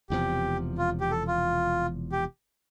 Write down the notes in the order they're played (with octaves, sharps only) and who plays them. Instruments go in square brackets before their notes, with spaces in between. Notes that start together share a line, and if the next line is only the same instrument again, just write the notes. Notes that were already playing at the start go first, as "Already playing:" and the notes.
[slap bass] E1 E2 C3 F3 [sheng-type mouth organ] G4
[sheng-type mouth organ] F4
G4
A4
F4
G4